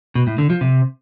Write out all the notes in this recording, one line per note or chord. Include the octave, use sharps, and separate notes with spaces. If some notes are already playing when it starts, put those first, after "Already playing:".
B2
A2
D3
F3
C3